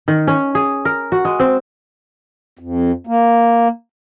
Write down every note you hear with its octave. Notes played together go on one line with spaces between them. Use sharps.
D#3
C#4
G#4
A#4
F#4
G#3
C4
F2
A#3